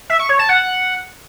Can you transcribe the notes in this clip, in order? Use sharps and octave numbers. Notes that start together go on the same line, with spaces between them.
E5
C#6
C#5
A5
F#5